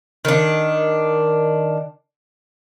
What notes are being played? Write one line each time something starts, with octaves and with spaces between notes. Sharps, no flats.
D#3 D4